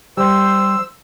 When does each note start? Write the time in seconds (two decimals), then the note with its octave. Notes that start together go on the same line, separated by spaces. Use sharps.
0.17 G3 C5 E6